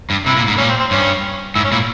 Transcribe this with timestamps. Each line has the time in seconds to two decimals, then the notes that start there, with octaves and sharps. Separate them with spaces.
0.10 G2
0.26 C3 E4
0.37 A#2
0.47 G#2
0.58 A#2 C#4
0.69 C4
0.79 C4
0.91 G2 C#4
1.55 G#2 E4
1.64 C#4
1.72 A#2 E4